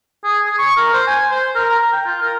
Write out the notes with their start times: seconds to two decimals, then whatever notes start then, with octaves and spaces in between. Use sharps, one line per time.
0.24 G#4
0.46 G#4
0.59 C#6
0.77 A#4
0.93 C5
1.07 G#5
1.31 C5
1.55 A#4
1.70 A#5
1.92 G5
2.06 F4
2.22 A#4